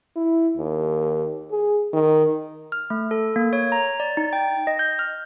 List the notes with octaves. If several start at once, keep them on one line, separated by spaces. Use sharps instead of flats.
E4
D#2
G#4
D#3
F6
A3
A4
A#3
C#5
A#5
D5
D#4
G5
D#5
G6
F6